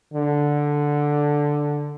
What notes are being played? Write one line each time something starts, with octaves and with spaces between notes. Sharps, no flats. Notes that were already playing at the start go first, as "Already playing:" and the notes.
D3